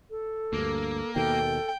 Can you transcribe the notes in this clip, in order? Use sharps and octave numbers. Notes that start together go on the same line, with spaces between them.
A4
D2 G2 A#3
D#2 B2 D#3 A4 G5